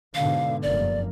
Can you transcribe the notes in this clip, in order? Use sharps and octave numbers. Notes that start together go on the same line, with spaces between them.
G#2 B2 D3 F5
F1 F#2 A#3 D5